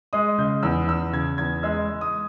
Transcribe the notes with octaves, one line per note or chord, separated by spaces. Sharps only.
G#3 D#6
C#3 G6
E2 E6
E2 E6
C#3 G#6
E2 G#6
G#3 E6
G#3
D#6